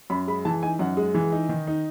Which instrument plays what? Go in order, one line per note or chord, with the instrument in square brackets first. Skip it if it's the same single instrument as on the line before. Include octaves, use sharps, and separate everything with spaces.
[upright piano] F#2 B5
G#3 B5
E3 A5
D#4 G#5
F#2 F#5
G#3
E3
D#4
D#3
D#4